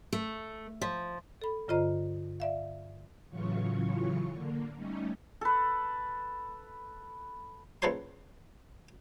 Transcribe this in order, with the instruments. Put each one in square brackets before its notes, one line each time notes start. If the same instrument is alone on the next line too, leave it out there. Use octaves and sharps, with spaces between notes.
[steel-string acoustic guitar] A3
F3
[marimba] A4 B5
G2 D3 F4 C5 D#5 A#5
D5 E5 F5
[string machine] A2 C#3 E3 F#3 F4 C#6
D3 A#3
G3 A3 C#4 D#4
[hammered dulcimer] A4 B4
[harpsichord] A#1 C#3 A4 B4 C5 C6